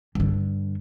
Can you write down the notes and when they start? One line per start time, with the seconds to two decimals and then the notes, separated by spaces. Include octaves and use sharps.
0.15 G2 D3